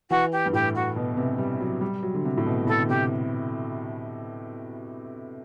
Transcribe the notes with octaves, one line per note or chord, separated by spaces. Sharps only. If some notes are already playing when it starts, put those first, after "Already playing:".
E3 F#4
G4
G2
A2 G4
F#4
B2
C3
G3
F#3
G3
F#3
D3
C3
A2
B2
A2 A4
D3
C3 G4